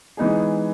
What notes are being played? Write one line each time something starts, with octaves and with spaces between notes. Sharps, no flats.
E3 G#3 B3 D#4 G#4